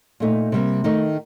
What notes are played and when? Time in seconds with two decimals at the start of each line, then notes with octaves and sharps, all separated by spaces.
0.20 A#2 A3 D#4
0.52 C3 G3 A#3
0.84 D#3 A3 D#4